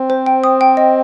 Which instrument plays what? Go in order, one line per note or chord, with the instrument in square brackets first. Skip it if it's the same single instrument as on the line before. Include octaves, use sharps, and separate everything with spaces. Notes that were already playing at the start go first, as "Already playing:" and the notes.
Already playing: [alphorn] C4
[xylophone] C5
G5
D#6
G5
D#5